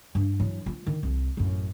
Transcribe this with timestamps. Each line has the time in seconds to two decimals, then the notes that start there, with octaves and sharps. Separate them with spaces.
0.15 G2
0.40 E3 F#3
0.66 F3 F4
0.87 D#3
1.03 C2 E3
1.37 A1 F#2